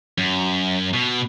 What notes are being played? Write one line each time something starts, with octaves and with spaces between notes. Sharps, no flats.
F#2
B2